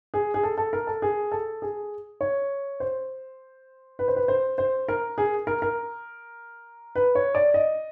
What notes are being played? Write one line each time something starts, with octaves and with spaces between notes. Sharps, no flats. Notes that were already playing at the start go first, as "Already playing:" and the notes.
G#4
G#4
A4
A4
A#4
A4
G#4
A4
G#4
C#5
C5
B4
C5
B4
C5
C5
A#4
G#4
A#4
A#4
B4
C#5
D5
D#5